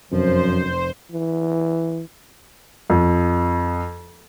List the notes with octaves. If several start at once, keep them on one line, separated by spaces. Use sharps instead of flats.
F1 F#2 F3 C5
E3
F2